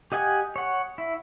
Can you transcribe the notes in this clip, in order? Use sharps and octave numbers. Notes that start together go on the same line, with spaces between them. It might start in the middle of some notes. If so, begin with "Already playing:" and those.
G4 D#5 F#5 G#5
C#5 F#5
E4